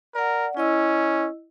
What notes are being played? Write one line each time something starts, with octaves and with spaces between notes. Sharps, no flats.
A#4 D5 F#5
C#4 E4 D#5 E6